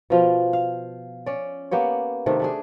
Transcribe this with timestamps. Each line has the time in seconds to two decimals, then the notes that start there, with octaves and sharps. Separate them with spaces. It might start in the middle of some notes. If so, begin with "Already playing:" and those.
0.10 B2 F3 F4
0.53 F5
1.26 C#4 D5
1.71 A#3 B3 G4 C#5
2.26 C3 D#3 A3
2.40 A3 D4 G#4